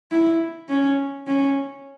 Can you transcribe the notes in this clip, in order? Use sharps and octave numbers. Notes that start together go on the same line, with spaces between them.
E4
C#4
C#4